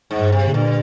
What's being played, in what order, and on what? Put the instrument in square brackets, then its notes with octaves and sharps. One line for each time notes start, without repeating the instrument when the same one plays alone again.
[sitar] G#2
[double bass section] G2
[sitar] C3
[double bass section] A#2 D3
[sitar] G2